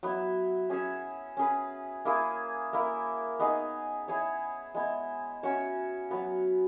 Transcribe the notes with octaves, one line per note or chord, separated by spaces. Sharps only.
F#3 B3 E4
C#4 G#4 C#5 E5
C#4 G#4 B4
A#3 E4 G#4
A#3 E4 A#4
B3 D#4 G#4
E4 G#4 C#5
G#3 B3 E4
C#4 F#4 C#5 E5
F#3 B3 F#4